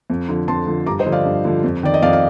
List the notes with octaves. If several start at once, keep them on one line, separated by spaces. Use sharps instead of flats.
F2
D3 F3
F2 A5 C6
D3 F3
G2 A#5 D6
C5 D#5
D3 F3
D5 F5
G2
D3 F3
F2
D#3 D5
D#5
F2 D5 F5
F5